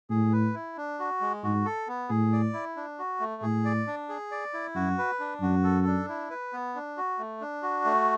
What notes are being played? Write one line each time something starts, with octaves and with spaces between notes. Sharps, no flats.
A2 G#4
B4
E4
D4
F#4
G#3
G#2 F#4
A4
B3
A2 G#4
D5
E4
D4
F#4
A3
A2 G#4
D5
D4
G#4
D5
E4
F#2 F#4
B4
D4
F#2 F#4
A4
D4
E4
B4
B3
D4
F#4
A3
D4
F#4
A3